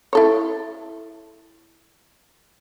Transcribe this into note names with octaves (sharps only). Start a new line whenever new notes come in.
E4 A4 C#5